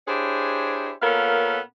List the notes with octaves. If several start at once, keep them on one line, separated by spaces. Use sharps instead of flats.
D4 E4 G4 G#4 C5 C#5
A#2 B3 C#4 A4 A#4 F5